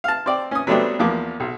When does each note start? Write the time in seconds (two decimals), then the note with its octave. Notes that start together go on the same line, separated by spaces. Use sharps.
0.04 F5 A5
0.26 C4 D5
0.51 C#4 D#6
0.67 F#3 G3 A3 B3 C4 D4
0.99 E2 F3 A#3 D6
1.40 B1